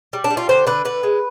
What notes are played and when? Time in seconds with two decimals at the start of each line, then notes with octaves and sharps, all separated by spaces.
0.13 G3
0.24 D4
0.30 G3
0.37 F4
0.49 D3 C5
0.67 D3 B4
0.85 D3 B4
1.03 G#3